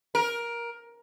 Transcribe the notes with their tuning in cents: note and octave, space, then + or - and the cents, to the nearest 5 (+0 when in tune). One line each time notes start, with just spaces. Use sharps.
A#4 +15